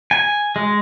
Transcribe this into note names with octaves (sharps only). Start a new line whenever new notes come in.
G#5
G#3